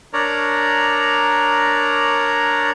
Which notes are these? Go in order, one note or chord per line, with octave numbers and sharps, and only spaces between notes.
D4 A#4 C#5 D5 A#5